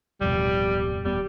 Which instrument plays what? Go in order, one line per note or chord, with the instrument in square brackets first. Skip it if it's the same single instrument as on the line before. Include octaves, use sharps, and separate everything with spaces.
[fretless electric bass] D1 F2 B2 [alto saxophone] G3
[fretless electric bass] D#1 B3 [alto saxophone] G3